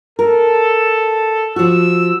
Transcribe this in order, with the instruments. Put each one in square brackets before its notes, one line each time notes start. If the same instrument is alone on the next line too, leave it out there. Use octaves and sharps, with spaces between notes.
[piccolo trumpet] A4 [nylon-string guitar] A#4
[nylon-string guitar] F3 F#4 [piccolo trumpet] E6